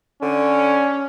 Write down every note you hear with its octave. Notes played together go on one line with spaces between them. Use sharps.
D3 C#4